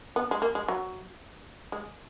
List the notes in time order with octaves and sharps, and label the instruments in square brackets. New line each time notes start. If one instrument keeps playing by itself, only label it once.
[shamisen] B3
G#3
A#3
G#3
F#3
G#3